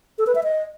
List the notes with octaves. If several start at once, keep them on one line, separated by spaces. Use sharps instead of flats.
A4
B4
E5
D#5